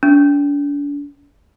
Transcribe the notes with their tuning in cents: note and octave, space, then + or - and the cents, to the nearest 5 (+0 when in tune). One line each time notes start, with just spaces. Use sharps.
D4 -40